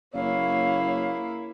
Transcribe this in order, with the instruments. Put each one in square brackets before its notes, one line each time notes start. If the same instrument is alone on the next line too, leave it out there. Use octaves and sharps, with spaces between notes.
[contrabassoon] F#1 [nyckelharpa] A#3 E4 [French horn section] C#5 [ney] F5